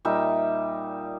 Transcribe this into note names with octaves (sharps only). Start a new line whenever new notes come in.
A#2 G3 D#4 E5